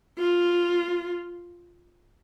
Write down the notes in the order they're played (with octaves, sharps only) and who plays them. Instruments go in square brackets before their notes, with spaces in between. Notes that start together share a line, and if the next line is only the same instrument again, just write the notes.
[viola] F4